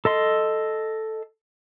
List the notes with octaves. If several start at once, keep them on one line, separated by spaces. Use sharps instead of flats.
A4 D#5 C6